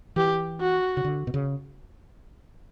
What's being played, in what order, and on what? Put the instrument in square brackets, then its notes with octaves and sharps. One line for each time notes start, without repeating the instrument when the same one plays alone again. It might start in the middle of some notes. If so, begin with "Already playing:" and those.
[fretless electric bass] E3 [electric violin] G4
[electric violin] F#4
[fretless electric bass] C#3
D3
B2
C#3